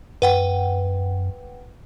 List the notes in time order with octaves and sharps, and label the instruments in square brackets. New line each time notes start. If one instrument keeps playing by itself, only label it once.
[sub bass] F#2 [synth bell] B4 F#5 G5